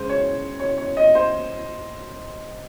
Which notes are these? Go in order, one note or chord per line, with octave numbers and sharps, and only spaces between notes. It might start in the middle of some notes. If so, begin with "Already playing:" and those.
Already playing: C#3 G#3 C5
C#5
C#5
C#5
D#5
C5